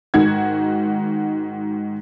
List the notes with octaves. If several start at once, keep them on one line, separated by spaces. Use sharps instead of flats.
G#2 D#3 F#4 G#6